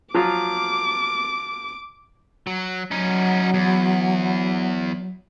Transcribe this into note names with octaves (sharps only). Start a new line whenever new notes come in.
F3 F#3 F4 D6
F#3
F#3 C#4 D#4
E2